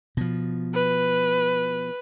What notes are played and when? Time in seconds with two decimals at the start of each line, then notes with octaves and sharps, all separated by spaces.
0.17 B2 F3
0.75 B4